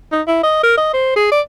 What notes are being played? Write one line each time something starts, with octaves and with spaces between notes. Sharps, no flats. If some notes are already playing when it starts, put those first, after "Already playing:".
D#4
E4
D#5
A#4
D#5
C5
G#4
D5